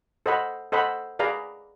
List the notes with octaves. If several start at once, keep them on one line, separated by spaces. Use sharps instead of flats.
A4 C5 D#5 F#5 B5
A4 C5 D#5 F#5 B5
G#4 B4 D5 F5 A#5